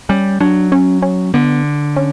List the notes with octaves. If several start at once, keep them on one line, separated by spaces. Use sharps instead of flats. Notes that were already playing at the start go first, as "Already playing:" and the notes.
G3 C#4
F#3 D4
C#4
C#4
D3 B3
C#4